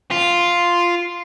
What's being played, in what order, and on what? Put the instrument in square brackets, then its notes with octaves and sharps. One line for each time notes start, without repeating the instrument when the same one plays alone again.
[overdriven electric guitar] F4